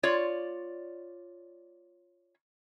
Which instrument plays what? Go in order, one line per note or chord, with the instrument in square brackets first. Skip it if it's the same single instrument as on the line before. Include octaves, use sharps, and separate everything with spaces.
[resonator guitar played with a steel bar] F4 C#5 D5